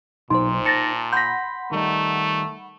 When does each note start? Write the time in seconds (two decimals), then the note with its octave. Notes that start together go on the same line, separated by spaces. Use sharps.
0.30 B1 A#2 D#4 C5 C6
0.66 A5 A6 A#6 C#7
1.12 F#5 B5 C6 G6 A#6 B6
1.72 D#3 G3 A3 D#4